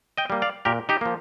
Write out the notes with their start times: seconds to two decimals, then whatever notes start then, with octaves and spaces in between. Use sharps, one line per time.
0.17 D#5 G5
0.30 G3 A#3
0.42 D5 F5
0.65 A#2 G4 A#4
0.89 D#4 G4
1.01 F3 A#3